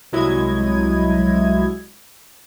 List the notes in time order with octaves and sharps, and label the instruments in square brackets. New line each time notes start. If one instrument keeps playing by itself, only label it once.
[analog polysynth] C2 F#3 G#3 E4 D#5 G#6